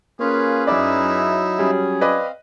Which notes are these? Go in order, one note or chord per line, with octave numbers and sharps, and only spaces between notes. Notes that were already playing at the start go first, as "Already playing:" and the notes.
A#3 C#4 F4 G#4 B4 C#5 F5
F#2 D#4 E4 D5 E5
F#3
G3 C#4 G#4
C4 B4 D5 D#5 F5